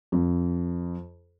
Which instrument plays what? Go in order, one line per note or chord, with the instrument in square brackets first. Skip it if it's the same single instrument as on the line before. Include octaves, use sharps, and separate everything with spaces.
[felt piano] F2